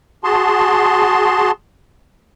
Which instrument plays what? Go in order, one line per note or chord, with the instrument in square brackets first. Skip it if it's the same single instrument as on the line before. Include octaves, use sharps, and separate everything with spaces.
[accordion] F#4 G#4 A5 C6